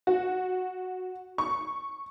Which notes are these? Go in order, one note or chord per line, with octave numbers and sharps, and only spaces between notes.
F#4
C#6